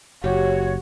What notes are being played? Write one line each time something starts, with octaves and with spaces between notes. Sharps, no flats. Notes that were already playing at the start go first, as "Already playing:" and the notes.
F#1 F#4 G4 C#5